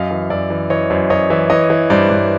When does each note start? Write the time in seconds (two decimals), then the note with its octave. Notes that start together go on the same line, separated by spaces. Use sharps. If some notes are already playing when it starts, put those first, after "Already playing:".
Already playing: F#2 D#5 F5
0.11 E3
0.30 F#2 D5 E5
0.50 E3
0.70 E3 C#5 D#5
0.90 F#2 C5 D5
1.10 F#2 C#5 D#5
1.30 E3 D5 E5
1.50 E3 C#5 D#5
1.70 E3
1.90 G2 C5 D5
2.10 G2